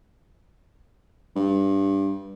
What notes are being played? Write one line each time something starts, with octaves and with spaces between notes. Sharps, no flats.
G2